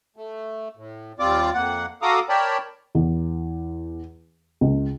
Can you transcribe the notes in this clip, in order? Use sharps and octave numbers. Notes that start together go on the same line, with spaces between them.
A3
A2
D#2 G3 C4 F4 D5 D6
F2 A#3 F#5
F#4 A4 F5 A#5 D6 D#6
A#4 C#5 D5 G5 A5 B5
E2
C#2